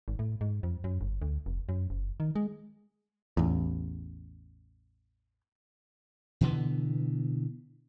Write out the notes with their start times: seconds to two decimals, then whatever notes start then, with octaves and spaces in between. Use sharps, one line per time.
0.08 G#1
0.19 A2
0.41 G#2
0.63 F2
0.84 F#2
1.01 G1
1.22 D2
1.46 F1
1.69 F#2
1.90 F#1
2.20 D#3
2.36 G#3
3.37 A1 E2
6.41 B2 D3 E3 B3